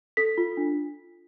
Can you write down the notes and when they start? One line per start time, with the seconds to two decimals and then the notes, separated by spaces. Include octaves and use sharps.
0.17 A4 B6
0.38 F4
0.57 D4